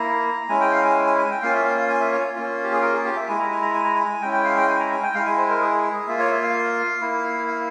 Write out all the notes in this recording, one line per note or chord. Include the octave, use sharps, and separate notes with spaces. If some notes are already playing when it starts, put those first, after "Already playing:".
Already playing: A#3 E4 A#5
G#3 C#4 E4 G#5
G5
F5
G#5
G#5
G#5
G5
A#3 C#4 F4 F5
E5
F5
F5
G#5
E5
C#5
A#3 C#4 F4
G4
G#4
A#4
G#4
G4
E5
G#3 E4 G#5
A#5
G#5
A#5
G#5
A#5
G#5
G#3 C#4 E4 G5
G5
F5
G5
G#5
A#5
G#5
G5
G#3 E4 F5
G#5
C5
A#4
G#4
A#3 F4 E5
C#5
E5
F5
A#3 E4
F5